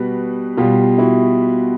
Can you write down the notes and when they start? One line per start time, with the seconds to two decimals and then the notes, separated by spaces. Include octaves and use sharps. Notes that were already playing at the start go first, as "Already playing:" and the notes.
Already playing: B2 G3 F#4 B4
0.57 B2 G3 F4 G4
0.98 E4 F#4